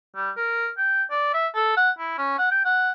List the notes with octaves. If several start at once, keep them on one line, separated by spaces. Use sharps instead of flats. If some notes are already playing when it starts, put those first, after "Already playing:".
G3
A#4
G5
D5
E5
A4
F#5
E4
C#4
F#5
G5
F#5